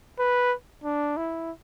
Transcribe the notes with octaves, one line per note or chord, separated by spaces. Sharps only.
B4
D4
E4